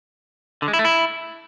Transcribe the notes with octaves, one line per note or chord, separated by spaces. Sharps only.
D3
G#3
E4
A3
E4